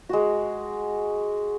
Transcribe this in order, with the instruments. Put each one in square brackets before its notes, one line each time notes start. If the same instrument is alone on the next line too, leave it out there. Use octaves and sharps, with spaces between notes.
[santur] G#3 F#4